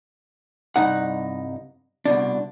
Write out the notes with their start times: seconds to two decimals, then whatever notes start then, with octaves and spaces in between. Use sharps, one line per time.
0.76 C2 G2 D#4 F#5
2.06 C2 B2 D4